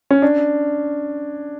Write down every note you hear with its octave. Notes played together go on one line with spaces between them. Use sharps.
C#4
D4